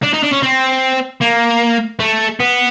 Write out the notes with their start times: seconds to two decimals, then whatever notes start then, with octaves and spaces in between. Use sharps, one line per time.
0.03 D4
0.13 D#4
0.23 D4
0.32 C#4
0.43 C4
1.21 A#3
2.00 A3
2.40 B3